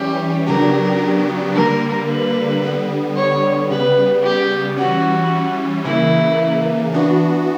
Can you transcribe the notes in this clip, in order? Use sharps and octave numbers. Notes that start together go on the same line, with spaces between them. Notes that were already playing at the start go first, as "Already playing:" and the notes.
Already playing: E3 G3 C#4 G4
C#3 F#3 B3 D4 G4 A#4
D3 G3 A#3 A#4
B4
D3 G3 B3
C#5
C#3 G3 B3 B4
G4
E3 G3 C#4 F#4
C#3 E3 A#3 E4
E3 B3 D4 F#4